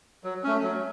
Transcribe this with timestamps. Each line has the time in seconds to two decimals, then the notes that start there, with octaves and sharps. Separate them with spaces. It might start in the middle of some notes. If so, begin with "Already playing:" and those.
0.24 F#3
0.44 A3 C#4
0.63 F#3